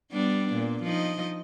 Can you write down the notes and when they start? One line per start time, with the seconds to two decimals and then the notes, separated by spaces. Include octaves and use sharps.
0.12 G3 B3 D4
0.54 A#2
0.83 F3 D#4 D#5